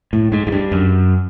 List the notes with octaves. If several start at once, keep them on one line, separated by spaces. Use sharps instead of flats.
A2
G#2
G#2
G2
F#2